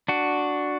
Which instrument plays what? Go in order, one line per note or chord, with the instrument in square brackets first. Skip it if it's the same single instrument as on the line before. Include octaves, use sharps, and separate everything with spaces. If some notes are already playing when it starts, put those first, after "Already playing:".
[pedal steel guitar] D4 F#4